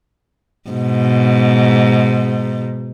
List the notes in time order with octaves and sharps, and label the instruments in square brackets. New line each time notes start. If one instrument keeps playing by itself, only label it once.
[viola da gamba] G#2 B2